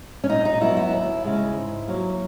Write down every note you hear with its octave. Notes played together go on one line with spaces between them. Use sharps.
C#4
A#2 D#4
D#4
F#3 B3 E4
E4
D#2
C#3 G#3
G#2
F#3 A#3